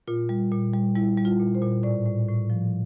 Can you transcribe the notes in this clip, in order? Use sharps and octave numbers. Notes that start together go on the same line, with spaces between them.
A#2 F4
G3
A#2
G3
G3 E4
G3
F4
A#2
C5
A#2
A2 D5
A2
A2
F3